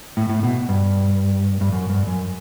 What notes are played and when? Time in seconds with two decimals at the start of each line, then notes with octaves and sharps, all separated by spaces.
0.17 A2
0.30 A2
0.43 B2
0.69 G2
1.61 G2
1.73 F#2
1.90 G2
2.07 F#2